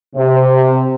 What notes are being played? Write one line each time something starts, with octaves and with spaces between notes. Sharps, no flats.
C3